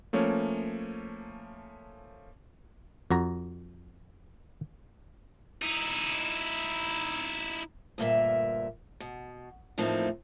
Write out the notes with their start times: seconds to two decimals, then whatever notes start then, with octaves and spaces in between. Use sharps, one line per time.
0.13 F3 A3 A#3 C#4 C#5
3.11 F2 F#4 A#5
5.62 D#4 E4
7.98 D2 G2 A#2 A#4 E5
9.00 B2
9.78 E2 A2 F3 A#3 C4 D#4